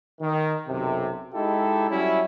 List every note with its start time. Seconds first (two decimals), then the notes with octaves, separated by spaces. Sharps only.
0.21 D#3
0.68 B1 F#2 C3
1.34 G#3 D#4 E4 G4 A4
1.90 F#3 G3 C#4 E4